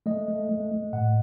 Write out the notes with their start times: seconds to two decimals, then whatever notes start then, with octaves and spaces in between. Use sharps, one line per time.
0.06 A3 D#5
0.28 A3
0.49 A3
0.71 A3
0.93 A2 F#5